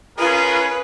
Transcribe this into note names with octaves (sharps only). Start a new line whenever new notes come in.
C#4 F4 G#4 A#4 B4